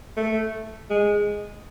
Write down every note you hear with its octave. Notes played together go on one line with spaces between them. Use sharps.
A3
G#3